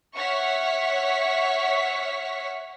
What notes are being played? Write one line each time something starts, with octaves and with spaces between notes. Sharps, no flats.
C#5 E5 F#5 C#6 F6 B6